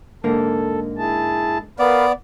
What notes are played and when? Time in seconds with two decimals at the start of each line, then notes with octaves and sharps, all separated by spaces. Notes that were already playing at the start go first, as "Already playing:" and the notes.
0.24 G#2 D3 A#3 A4
0.98 E4 G#4 A5
1.79 B3 A#4 B4 D5 F5